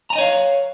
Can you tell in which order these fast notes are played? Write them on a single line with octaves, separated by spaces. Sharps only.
A#5 G#5 D#5 C#5 F5